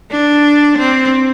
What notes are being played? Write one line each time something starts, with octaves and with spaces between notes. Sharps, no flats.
D4
C4